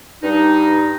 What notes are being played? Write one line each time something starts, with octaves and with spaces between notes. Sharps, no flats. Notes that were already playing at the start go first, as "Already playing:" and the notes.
G2 D#4